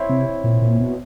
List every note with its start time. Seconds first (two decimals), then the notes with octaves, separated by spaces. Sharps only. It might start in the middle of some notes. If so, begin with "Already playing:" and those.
Already playing: C4 E4 C#5
0.09 C3
0.44 A#2
0.62 A#2
0.80 B2